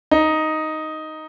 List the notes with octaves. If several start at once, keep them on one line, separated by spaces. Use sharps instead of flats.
D#4